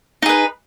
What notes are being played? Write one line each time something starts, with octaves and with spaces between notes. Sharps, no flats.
D#4 G#4 B4